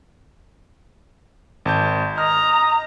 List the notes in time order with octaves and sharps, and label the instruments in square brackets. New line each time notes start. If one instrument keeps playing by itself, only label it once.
[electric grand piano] G#1 A5 G6
[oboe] D#5 [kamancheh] A#5 [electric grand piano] F6